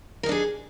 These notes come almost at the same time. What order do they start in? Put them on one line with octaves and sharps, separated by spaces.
A#4 D#4 D4 G#4